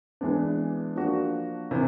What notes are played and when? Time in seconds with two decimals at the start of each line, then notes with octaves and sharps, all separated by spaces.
0.21 E3 G#3 B3 D4
0.96 F3 A#3 D4 F#4
1.71 C3 E3